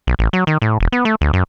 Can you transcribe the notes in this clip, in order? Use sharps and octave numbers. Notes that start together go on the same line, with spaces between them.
B1
A1
F#3
D#3
A2
E1
B3
A3
D2
F#2